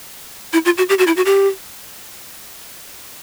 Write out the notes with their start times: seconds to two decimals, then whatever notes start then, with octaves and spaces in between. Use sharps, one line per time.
0.53 E4
0.65 F4
0.78 F#4
0.89 G4
0.99 F#4
1.07 E4
1.17 F#4
1.26 G4